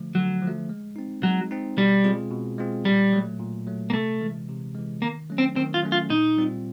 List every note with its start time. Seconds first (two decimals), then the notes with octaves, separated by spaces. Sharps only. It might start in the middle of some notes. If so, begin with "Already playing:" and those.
Already playing: D3 F3 A3
0.15 D3 F#3
0.42 F3
0.47 A3
0.69 G#3
0.96 C4 D#4
1.23 F#3 G#3
1.51 C4 D#4
1.77 B2 G3
2.04 G#3 C4 F4 G#4
2.31 B2
2.58 G#3 C4 F4 G#4
2.85 A#2 G3
3.13 F#3 A3
3.39 A#2
3.66 F#3 A3
3.90 A#3
3.94 C3 A3
4.21 E3 G#3
4.49 C3
4.75 E3 G#3
5.02 D#3 A#3
5.30 F#3 A3 C#4
5.38 C4
5.56 D#3 C4
5.74 F4
5.83 F#3 A3 C#4
5.92 F4
6.10 A#2 D#4
6.38 G3 C4 F4